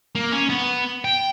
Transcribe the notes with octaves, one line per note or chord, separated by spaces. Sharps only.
A#3
C#4
B3
G5